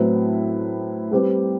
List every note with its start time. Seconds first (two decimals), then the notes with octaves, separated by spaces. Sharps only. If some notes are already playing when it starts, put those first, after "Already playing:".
Already playing: A2 F#3 C4 E4 B4
1.11 G3 C4 G4 B4